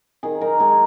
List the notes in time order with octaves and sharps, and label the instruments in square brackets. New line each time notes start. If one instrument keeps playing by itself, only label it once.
[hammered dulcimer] D#3 G#4
D#4 A#4
G#3 G#4